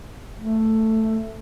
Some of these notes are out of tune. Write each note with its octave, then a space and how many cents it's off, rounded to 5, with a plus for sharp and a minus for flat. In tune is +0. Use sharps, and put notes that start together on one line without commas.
A3 +5